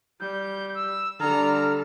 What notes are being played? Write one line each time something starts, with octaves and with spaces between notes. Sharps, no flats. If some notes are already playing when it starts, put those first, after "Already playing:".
G3 G6
E6
D3 G3 A4 A#5 F6